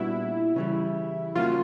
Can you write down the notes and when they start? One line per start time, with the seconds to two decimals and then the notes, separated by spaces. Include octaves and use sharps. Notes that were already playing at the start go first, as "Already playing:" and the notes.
Already playing: A#2 G3 B3 D4 E4 F#4
0.56 C#3 E3 G3
1.35 C#3 F3 A#3 C#4 F4 F#4